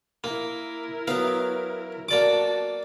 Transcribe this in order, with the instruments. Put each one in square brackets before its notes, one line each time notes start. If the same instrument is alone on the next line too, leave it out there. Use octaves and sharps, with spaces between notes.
[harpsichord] A#3 [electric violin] E4 A#4
[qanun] F#3 B3 [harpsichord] F5
[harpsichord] A#3 D5 D6 [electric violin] F#4 A5